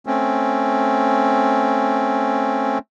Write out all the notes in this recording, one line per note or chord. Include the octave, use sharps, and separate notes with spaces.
A3 C4 C#4